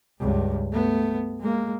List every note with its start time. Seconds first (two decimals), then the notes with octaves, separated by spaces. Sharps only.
0.20 C#2 G2
0.72 A3 B3
1.40 G#3 A#3